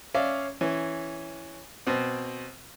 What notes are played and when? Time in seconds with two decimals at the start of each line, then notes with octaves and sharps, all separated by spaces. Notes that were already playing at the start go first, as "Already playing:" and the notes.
0.14 C#4 D5 E5 F5
0.61 E3 C#4
1.87 B2 C4